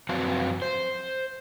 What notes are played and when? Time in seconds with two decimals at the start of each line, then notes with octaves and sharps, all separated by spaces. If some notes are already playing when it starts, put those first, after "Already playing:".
0.09 F#2 F3 C4 F#4 B4 F5
0.62 C5